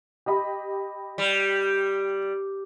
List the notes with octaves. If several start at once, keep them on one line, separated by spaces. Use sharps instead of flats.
G4 D#5 B5
G3